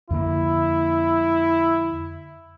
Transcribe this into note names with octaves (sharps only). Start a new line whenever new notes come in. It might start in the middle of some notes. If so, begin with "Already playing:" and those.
F2 D3 A#3 E4